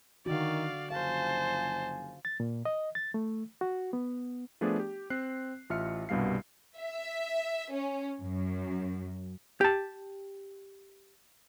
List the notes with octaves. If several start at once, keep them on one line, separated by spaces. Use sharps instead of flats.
D3 D#3 F#4 D5 F5
F#1 F3 C5 F5 G#5 A5
A6
A#2
D#5
A6
A3
F#4
B3
F3 A3 B3 D4 G#4 D5
G4
C4 F#6 C7
A1 F4 E5 F6 C#7
C2 G2 B2 G3 F5 C7
E5
C#4
F#2
G4 A5